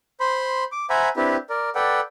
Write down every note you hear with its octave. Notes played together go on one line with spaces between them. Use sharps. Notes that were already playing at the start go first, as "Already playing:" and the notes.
C5 B5 C6
D6
C5 E5 F#5 G#5 A#5 B5
C4 D4 E4 G4 B4
A#4 D5
A4 B4 D5 F#5 G5